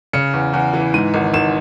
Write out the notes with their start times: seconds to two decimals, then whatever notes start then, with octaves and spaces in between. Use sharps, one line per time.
0.13 C#3 C#7
0.34 E2
0.54 E2
0.74 E3
0.94 G#2 D#7
1.14 G#1
1.34 G#1 E7